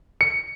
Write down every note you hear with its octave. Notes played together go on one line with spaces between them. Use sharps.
C#7